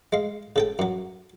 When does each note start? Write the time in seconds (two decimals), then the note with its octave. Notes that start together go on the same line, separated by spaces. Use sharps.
0.13 G#3 F5
0.56 C#3 A4 G5
0.79 F#2 F#3